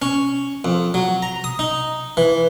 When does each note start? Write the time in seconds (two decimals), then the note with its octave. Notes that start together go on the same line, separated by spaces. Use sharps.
0.02 C#4
0.65 F2
0.94 F#3
1.22 A#5
1.44 D#6
1.59 D#4
2.17 E3